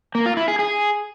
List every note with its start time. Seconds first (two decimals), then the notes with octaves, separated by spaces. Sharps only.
0.15 A#3
0.26 F4
0.37 E4
0.48 G#4
0.59 G#4